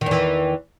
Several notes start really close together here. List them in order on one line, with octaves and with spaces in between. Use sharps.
D#3 E2 E3